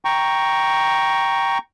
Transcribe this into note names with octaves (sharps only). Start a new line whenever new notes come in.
G5 A#5 C#6